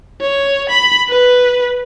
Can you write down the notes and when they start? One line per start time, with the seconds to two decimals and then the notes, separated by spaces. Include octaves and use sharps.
0.21 C#5
0.69 B5
1.08 B4